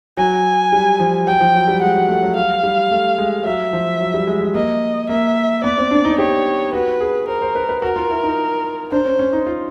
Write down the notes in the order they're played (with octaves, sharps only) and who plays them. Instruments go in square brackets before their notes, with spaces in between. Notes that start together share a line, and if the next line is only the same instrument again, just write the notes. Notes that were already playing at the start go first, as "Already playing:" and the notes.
[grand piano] F#3 [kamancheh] G#5
[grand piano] G3
F3
[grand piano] F#3 [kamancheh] G5
[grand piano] F3
F#3
G3
[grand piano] G#3 [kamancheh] F#5
[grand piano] F#3
A3
F#3
[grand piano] G3 [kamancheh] F5
[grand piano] G3
A3
G#3
[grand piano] F#3 [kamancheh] E5
[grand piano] F3
F#3
G3
G#3
G#3
[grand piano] A#3 [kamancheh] D#5
[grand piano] A#3 [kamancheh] E5
[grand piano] B3 [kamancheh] D5
[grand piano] C4
D4
D#4
[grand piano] G4 [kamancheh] C#5
[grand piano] F#4 [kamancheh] B4
[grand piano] G#4
[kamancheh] A#4 [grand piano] C5
[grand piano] C5
B4
B4
[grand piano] F#4 [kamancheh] A#4
[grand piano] F4
E4
D#4
[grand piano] D4 [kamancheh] C5
[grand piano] C#4
C#4
D#4
F4